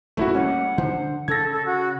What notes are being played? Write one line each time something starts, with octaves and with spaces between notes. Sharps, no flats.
D#1 G#1 F2 A3 E4 F#4
G3 A3 A#3 C#4 F#5
D3 C5
C#3 A4 G#6 A#6
A4
F#4